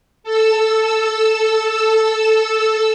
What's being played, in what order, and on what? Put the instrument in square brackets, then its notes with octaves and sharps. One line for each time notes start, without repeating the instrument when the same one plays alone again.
[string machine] A4 E6